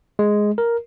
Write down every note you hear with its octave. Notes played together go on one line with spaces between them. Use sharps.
G#3
A#4